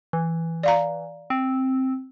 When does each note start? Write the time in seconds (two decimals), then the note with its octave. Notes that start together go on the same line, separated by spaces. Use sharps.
0.13 E3
0.63 D5 F5 A#5
1.30 C4